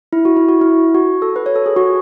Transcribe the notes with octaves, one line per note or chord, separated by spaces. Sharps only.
E4
F#4
E4
F#4
E4
F#4
A4
B4
C#5
A4
G#4
F#4